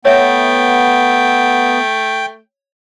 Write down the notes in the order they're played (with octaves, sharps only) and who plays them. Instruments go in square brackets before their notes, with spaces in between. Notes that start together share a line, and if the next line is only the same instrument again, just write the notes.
[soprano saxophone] A3 [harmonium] B3 [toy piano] C#5 E5 [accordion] G5